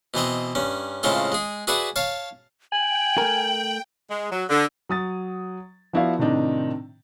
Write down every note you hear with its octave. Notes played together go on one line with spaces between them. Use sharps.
B2 E3 C4 D#5
G2 C#4
A2 C#3 G#3 C4 F4 A4
G#3 G#4
F#4 G#4 B4 D5 E5 F#5
C#5 F5 A5
G5 G#5 F#7
A3 A#4
G#3
F#3
D3
F#3 D#6 A6
F3 B3 E4 F#4 D5 F5
A2 C3 D#3 C4 D4 D#4